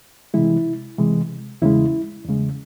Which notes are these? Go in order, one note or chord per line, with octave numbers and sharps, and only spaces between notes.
C3 E3 G#3 E4
C3 E3 G#3
E2 C#3 G#3 E4
E2 C#3 G#3